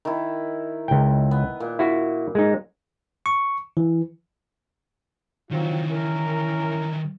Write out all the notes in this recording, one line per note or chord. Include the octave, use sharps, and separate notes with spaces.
D#3 E4
C#2 G5
B3
A#2
E4 F#4
G#3 D#4
C#6
E3
D#3 E3 F#3 C4 F4
C#4 E4 A#4